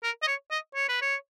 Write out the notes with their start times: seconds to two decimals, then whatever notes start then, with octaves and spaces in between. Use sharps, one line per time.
0.03 A#4
0.23 D#5
0.27 C#5
0.51 D#5
0.75 C#5
0.89 B4
1.02 C#5